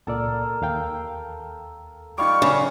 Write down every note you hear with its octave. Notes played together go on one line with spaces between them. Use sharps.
C#2 A#2 A4 A#4 D5
D#2 F5 G5
G3 D#4 F4 F5 C#6 D6
F#2 C#3 G#4 D5